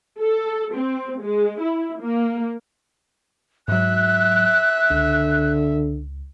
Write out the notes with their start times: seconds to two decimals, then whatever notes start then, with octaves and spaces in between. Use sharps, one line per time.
0.21 A4
0.74 C4
1.20 G#3
1.60 E4
2.00 A#3
3.68 G#2 F#3 E5 F#6
4.91 C#2 D3